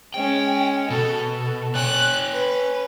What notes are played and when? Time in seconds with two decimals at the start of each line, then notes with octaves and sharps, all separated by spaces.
0.14 G#3 C#4 G5
0.90 B2 A4
1.36 A4
1.75 C#5 G5 G#5 F#6
2.33 B4